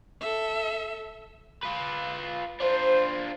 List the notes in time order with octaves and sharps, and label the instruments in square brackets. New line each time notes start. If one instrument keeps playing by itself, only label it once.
[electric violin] A4 E5
[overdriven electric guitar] F4 B4
[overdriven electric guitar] D4 F4 [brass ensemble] C5